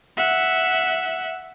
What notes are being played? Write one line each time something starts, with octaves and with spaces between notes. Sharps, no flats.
E5 F#5